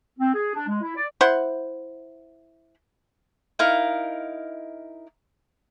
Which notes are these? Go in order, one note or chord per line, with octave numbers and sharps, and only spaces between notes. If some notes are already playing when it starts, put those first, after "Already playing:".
C4
G#4
D4
G#3
E4
D5
E4 C5 F#5
D#4 E4 A#4 F5